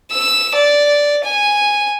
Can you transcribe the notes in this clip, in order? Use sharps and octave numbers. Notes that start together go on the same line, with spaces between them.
E6
D5
G#5